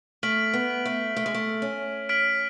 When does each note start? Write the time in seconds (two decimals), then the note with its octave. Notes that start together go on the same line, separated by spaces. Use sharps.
0.23 A3 F6 B6 D7 F#7
0.53 B3
0.85 A3
1.16 A3
1.26 G#3
1.35 A3
1.62 C#4
2.09 F6 B6 D7 F#7